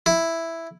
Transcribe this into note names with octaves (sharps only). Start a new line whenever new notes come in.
E4